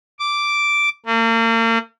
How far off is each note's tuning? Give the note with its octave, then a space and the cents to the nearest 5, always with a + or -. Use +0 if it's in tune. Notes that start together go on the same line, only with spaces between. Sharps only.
D6 -5
A#3 -40